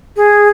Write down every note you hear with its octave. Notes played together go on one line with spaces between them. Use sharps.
G#4